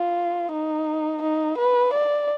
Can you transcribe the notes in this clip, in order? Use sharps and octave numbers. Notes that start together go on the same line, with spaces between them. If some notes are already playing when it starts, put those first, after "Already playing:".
Already playing: F4
D#4
D#4
B4
D5